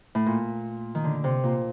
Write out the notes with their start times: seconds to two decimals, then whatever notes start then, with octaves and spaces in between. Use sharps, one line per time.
0.15 A2
0.26 A#2
0.95 D#3
1.04 D3
1.24 C3
1.44 A#2